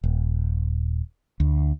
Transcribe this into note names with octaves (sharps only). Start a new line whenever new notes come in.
D#1
D2